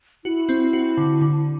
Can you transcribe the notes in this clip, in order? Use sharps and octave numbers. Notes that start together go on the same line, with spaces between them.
E4 F#4
C4
F#4
D3
D3